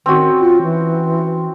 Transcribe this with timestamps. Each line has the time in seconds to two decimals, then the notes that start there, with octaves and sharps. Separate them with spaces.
0.06 D#3 C4 C#4 F#4
0.41 F4
0.62 E3